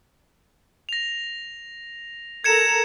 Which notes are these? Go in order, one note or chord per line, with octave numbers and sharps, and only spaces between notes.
A#6 F7
A4 A#4 A#5 G#6 C#7 E7